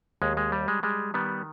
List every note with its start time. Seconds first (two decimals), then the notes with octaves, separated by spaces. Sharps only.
0.22 D#2 G#3
0.37 G#3
0.52 G3
0.68 G#3
0.83 G3 G#3
1.14 D#3 G3 B3